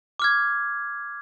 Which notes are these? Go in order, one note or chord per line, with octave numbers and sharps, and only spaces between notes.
D6 F6 G#6